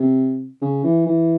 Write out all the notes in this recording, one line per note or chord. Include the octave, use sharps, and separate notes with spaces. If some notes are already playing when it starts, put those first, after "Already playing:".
Already playing: C3
C#3
E3
E3